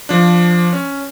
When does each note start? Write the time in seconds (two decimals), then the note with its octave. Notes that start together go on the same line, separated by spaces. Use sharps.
0.09 F3 D4
0.73 C#4